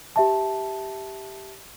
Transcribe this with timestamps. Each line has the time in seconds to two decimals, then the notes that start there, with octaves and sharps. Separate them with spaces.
0.16 G4 E5 A5